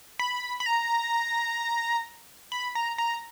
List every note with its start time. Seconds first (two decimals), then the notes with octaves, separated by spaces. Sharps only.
0.19 B5
0.60 B5
0.66 A#5
2.52 B5
2.75 A#5
2.98 A#5